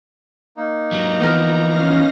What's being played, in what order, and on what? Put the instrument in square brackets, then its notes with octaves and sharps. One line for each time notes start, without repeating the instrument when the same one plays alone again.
[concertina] A#3 D#4
[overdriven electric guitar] G#2 F#3 [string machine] A#5
[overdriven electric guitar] E3 F3 [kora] B3 A#4
[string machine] C#4 F5 A#6